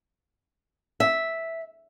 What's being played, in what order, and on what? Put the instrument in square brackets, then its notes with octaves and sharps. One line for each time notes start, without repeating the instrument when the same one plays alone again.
[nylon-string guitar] E5